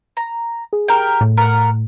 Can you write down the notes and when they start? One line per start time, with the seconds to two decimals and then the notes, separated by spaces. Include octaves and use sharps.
0.17 A#5
0.73 G#4
0.88 G4 A#4 G5
1.21 A2
1.37 A#4 F#5